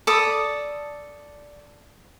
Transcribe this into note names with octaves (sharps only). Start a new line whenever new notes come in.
A4 D5 B5 D#6